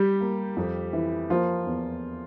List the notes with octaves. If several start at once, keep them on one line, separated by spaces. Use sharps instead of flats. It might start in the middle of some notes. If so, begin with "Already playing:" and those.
Already playing: G3 G4
A#3
F2
E3
F3 A#3 F4
E2